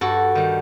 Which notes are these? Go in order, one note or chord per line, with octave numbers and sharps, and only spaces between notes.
G2 F#4 A4
D#3 G3